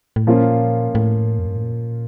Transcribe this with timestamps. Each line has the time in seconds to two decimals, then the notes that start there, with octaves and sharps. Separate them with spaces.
0.16 A2
0.27 A#2 F3 A#3 C#4 F4
0.95 A2
1.39 F2
1.46 G2
1.56 A2
1.63 A#2